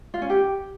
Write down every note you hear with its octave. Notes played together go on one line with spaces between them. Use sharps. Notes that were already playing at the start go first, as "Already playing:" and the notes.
F4
C#4
G4